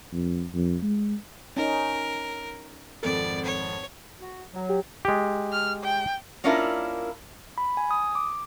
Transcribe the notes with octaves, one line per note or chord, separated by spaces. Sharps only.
F2
F2
G#3
C#4 D#4 A#4
G#1 F2 A4 D5
C#5
F#4
F#3
G4
G#3 G4
F6
G5
A#3 C#4 D4 E4 F4 A#4
B5
G#5
D#6
D6